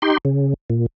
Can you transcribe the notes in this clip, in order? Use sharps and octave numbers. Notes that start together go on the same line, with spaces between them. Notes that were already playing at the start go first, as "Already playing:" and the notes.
D#4 G4 C6
C#3
A#2